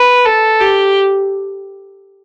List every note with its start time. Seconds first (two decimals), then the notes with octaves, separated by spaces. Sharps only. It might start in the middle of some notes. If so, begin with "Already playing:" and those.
Already playing: B4
0.25 A4
0.60 G4